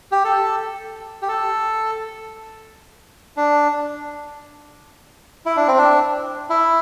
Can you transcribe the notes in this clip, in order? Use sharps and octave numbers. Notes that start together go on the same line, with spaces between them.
G4
A4
G4
A4
D4
E4
D4
C4
D4
E4